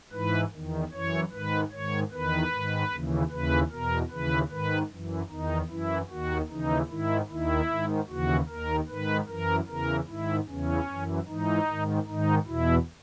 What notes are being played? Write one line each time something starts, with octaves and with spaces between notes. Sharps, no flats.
G#2 E3 B4
E2 D#3
F#2 E3 C#5
G#2 D#3 B4
G#2 D#3 C#5
E2 D#3 B4
G#2 D#3
D#2 C#3 E3
D#2 C#3 E3 B4
E2 B2 A#4
D#2 C#3 E3 B4
G#2 D#3 B4
F#2 E3
E2 D#3 D#4
F#2 E3 E4
D#2 D#3 F#4
D#2 C#3 E3 D#4
G#2 D#3 E4
D#2 D#3 E4
G#2 D#3
D#2 C#3 E3 F#4
D#2 D#3 A#4
G#2 D#3 B4
F#2 E3 A#4
E2 C#3 E3 A#4
G#2 D#3 E4
E2 C#3 E3 C#4
F#2 E3
G#2 E3 D#4
G#2 D#3
G#2 D#3 D#4
E2 B2 E4